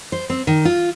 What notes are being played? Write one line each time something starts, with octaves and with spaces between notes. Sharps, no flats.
C5
C4
D#3
F4